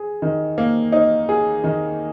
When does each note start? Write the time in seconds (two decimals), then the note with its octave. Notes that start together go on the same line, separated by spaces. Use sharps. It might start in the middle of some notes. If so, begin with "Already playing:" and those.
Already playing: G#4
0.22 D#3
0.58 A#3
0.92 D#4
1.29 G#4
1.64 D#3